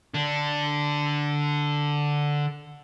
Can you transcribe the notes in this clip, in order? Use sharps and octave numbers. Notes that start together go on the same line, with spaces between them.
D3 D4